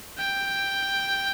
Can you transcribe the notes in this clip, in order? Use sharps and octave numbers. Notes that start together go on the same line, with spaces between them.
G5